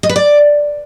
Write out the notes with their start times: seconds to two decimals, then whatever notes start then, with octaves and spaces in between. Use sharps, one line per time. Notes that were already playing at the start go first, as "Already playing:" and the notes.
0.03 D#5
0.09 B4
0.16 D5